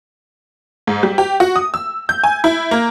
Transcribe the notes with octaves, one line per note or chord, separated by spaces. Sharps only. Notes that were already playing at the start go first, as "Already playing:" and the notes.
G#2
G3
G4
F#4
D#6
E6
G6
G#5
E4
A#3